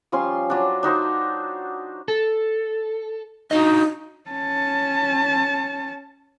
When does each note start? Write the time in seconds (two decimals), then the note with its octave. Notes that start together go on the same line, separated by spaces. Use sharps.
0.12 F3 G3 C#4 C6
0.50 F#3 D4
0.83 D4 D#4 F#4 C5
2.08 A4
3.51 D4 D#4 F#4 D#5
4.30 C#4 A5